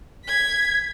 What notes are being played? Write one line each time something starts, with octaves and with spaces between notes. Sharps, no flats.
G#6 B6